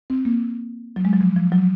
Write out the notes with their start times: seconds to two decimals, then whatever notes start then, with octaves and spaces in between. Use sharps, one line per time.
0.10 C4
0.25 A#3
0.96 F#3
1.05 G#3
1.13 F#3
1.21 F3
1.36 F3
1.52 F#3